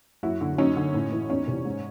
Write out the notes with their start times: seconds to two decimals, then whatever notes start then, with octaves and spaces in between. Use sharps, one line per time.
0.23 F#2 E4 F#4
0.41 D3
0.58 F#2 C#4 D#4
0.76 D3
0.94 A2
1.12 E3
1.30 E2 C#4 D#4
1.47 C3 E3
1.65 G#2